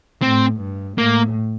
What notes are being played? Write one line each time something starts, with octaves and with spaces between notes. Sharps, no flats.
A2 C4
G2
A2 A#3